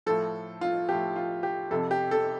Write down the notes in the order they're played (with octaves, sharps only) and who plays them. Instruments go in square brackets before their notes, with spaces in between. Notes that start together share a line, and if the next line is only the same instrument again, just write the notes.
[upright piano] A2 F3 A4
F4
A2 F3 G4
F4
G4
F2 C3 F3 A4
G4
A4